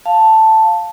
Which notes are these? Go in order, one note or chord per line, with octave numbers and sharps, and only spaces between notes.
F5 A5